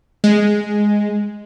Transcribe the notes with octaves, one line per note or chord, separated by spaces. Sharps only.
G#3